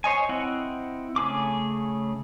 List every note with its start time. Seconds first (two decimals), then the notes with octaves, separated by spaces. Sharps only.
0.04 C5 C#5 D#5 G#5
0.29 C4 E4 D#5 F#5
1.16 C#3 A3 G#4 D6